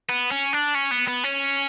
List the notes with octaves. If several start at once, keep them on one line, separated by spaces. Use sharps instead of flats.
B3
C#4
D4
C#4
B3
B3
C#4